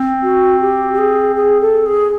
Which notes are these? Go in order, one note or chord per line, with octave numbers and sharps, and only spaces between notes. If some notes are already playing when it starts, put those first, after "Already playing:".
Already playing: C4
F#4
G4
G4
G#4
G#4
A4
G#4